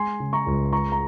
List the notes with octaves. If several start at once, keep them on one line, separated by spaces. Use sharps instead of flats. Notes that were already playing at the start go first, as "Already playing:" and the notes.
Already playing: G#3 G#5 C6
C#3
A#5 C#6
C#2
G#3 A#5 C#6
A#5